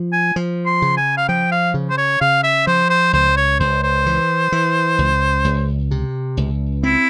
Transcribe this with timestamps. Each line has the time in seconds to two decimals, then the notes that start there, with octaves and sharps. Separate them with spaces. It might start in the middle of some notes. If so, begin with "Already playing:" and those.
Already playing: F3
0.13 G#5
0.36 F3
0.66 C6
0.82 C#3
0.97 G#5
1.17 F5
1.28 F3 G5
1.52 F5
1.74 C#3
1.90 C5
1.98 C#5
2.21 C#3 F5
2.44 E5
2.67 F3 C5
2.90 C5
3.13 C#2 C5
3.37 C#5
3.60 C#2 C5
3.83 C5
4.06 E3
4.52 E3
4.98 C#2
5.44 C#2
5.91 C3
6.37 C#2
6.83 C4 E4